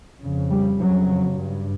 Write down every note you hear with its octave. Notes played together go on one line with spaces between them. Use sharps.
F2 C#3
G3
F2 C#3 F#3
G2